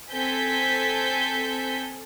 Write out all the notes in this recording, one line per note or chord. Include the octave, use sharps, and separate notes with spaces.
C4 A4 G#5 G6 B6